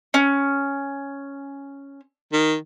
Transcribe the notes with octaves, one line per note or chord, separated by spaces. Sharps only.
C#4
D#3